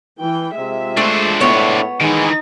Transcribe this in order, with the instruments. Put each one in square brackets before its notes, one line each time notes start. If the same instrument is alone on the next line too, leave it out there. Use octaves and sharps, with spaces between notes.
[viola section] E3 G5
[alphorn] C3 [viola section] G#3 F4 E5
[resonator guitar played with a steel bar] A3 [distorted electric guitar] D4 C5
[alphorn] A2 [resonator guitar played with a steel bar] B3 C#5
[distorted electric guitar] D#3 E3 [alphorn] G#3 [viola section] D#4